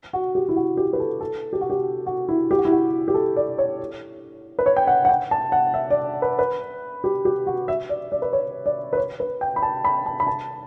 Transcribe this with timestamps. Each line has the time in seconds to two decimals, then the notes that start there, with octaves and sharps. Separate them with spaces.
0.13 F#4
0.35 G4
0.49 E4
0.56 F#4
0.77 G4
0.93 B4
1.00 A4
1.20 A4
1.53 G4
1.61 F#4
1.70 G4
2.06 F#4
2.29 E4
2.51 G4
2.58 F#4
2.65 E4
2.72 F#4
3.08 G4
3.14 A4
3.36 D5
3.58 C#5
4.59 B4
4.66 C#5
4.77 G5
4.87 F#5
5.05 F#5
5.09 G5
5.31 A5
5.52 F#5
5.74 E5
5.91 D5
6.22 B4
6.39 B4
7.04 G4
7.25 G4
7.47 F#4
7.68 E5
7.89 D5
8.12 D5
8.22 B4
8.33 C#5
8.66 D5
8.93 B4
8.97 C#5
9.20 B4
9.41 G5
9.56 B5
9.63 A5
9.85 B5
10.06 A5
10.20 B5
10.27 A5